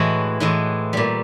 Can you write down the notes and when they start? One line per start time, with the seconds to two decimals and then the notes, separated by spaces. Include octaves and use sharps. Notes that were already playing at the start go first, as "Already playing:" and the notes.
Already playing: A2 E3 G#3 F#4
0.40 A2 E3 G#3
0.93 A#2 G3